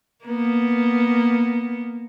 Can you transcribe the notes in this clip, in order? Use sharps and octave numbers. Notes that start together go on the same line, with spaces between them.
A#3 B3